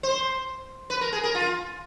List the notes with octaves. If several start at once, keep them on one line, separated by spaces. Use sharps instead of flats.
C5
B4
A#4
G#4
A#4
F4